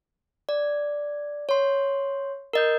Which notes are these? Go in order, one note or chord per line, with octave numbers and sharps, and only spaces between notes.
D5
C#5 C6
A#4 D#5 G6